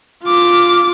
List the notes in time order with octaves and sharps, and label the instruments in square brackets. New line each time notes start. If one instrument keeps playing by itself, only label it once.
[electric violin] F4 D6